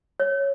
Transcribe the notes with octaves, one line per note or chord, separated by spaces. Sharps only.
C#5